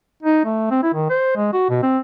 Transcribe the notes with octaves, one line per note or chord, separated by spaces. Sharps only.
D#4
A3
C4
E4
D#3
C5
G#3
F#4
B2
C4